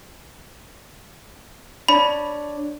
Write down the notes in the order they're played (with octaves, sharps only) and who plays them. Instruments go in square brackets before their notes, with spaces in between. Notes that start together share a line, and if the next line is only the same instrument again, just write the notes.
[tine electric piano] D4 C#5 D5 [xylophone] B5